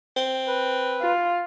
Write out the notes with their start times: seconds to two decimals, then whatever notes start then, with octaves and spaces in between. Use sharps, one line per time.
0.17 C4
0.47 B4
1.01 F4